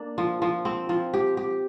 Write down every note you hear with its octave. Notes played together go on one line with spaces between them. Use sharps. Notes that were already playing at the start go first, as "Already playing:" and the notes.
Already playing: A#3 D4
F3
F3
C4
F3
G4
G4